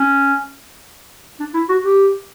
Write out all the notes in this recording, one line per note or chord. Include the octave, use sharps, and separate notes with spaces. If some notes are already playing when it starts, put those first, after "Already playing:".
Already playing: C#4
D4
E4
F#4
G4